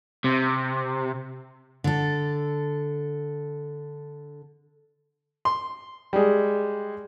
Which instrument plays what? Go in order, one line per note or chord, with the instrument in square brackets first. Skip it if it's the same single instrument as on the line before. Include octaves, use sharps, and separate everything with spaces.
[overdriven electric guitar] C3
[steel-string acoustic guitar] D3 A4
[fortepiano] C6
G3 G#3